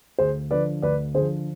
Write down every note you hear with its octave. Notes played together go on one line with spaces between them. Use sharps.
D2 G#4 C5
D3 F3 B4 D5
D2 B4 D5
D3 F3 G#4 C5